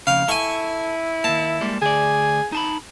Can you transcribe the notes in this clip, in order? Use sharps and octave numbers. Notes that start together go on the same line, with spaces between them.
F2 C#3 F5
E4 A4 G#5 C#6
D#2 A#3 A5
G3 G#3 A#3
D2 G#4 D5
D#4 A5 B5